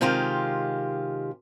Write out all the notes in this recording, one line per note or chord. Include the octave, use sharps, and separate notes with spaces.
C3 D#3 G#3 F4 G4